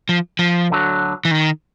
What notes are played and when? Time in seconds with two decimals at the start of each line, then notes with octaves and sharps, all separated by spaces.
0.09 F3
0.39 F3
0.70 D2 D3 F#3
1.25 E3
1.31 D#3